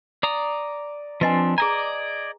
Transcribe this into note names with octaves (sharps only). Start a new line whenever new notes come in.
D5 A#5 D#6
F3 C4 D4 B4 D#5 G#5
G#4 D5 D#5 G#5 A#5